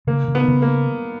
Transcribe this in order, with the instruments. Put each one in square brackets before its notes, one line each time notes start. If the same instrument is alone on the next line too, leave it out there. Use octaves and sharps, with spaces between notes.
[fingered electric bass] C#3 [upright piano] A#3
[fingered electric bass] C#3
[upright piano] B3
[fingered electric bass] C#3
[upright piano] A#3